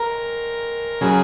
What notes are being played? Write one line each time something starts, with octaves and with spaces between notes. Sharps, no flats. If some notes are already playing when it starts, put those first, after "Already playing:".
Already playing: A#4
C#3 F#3 G#4